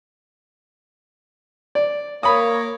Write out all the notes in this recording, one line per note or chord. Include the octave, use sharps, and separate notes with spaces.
D5
A#3 C#5 B5 D#6